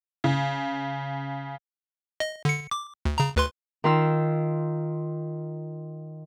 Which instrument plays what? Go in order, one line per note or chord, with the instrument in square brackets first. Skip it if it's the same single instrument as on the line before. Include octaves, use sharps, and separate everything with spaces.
[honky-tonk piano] C#3
[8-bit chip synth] D#5
D3 C#7
D6
D2
C#3 A#5
D2 B4 C6
[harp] D#3 F4 E6